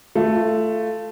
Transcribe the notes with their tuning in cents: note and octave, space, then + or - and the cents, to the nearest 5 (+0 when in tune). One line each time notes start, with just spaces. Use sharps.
A3 +0 F4 -20